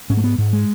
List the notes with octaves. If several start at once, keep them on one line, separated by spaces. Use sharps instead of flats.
G#2 C#4
A3
B3
G#2
G#3